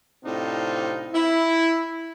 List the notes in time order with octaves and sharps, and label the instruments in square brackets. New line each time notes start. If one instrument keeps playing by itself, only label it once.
[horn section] A2 C3 C4 D4 D#4 F4
E4